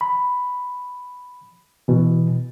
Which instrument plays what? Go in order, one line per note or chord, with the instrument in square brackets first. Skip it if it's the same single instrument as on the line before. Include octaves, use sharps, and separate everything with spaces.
[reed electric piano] B5
B2 E3